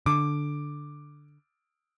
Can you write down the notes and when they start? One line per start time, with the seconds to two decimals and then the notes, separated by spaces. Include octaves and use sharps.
0.06 D3 D6